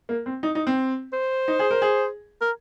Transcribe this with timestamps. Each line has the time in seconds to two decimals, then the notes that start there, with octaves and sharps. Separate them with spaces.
0.09 A#3
0.26 C4
0.43 D#4
0.55 D#4
0.67 C4
1.13 C5
1.48 D#4
1.59 G#4
1.71 A#4
1.82 G#4
2.41 A#4